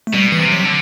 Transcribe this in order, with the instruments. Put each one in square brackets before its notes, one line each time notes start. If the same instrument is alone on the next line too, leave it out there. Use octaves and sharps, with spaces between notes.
[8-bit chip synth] A3
[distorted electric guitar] B2 [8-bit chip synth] G3
[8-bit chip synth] E3
[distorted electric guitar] C3
[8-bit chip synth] F#3
[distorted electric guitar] D3